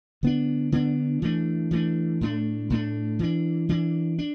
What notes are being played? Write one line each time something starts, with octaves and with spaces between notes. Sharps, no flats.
D3 B3 D4
D3 B3 D4
E3 A3 D4
E3 A3 D4
A2 A3 D4
A2 A3 D4
E3 D4
E3 D4
D4